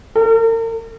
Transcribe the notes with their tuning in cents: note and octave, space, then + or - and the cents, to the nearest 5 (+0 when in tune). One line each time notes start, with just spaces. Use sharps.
A#4 -40